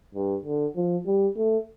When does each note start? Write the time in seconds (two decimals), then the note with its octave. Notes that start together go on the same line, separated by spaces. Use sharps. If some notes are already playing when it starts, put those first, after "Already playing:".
0.15 G2
0.45 D3
0.76 F3
1.06 G3
1.36 A3